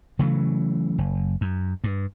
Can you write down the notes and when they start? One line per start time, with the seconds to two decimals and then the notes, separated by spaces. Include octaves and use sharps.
0.19 C#3 E3 F#3 A3
0.98 F#1
1.41 F#2
1.84 G2